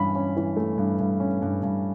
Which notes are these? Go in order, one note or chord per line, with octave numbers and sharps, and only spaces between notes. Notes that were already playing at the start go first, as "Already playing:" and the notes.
Already playing: G2 E3 C#4 B5
C#4
E3
A3
G2
G2
C#4
G2
G2